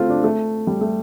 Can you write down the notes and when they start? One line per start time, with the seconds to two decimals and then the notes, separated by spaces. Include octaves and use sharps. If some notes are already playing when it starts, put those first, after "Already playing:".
Already playing: A3 C4 F4
0.10 D4
0.24 A3
0.67 G3
0.81 A3